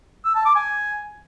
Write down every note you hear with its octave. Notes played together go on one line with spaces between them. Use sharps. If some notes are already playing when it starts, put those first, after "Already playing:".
E6
A5
D6
G#5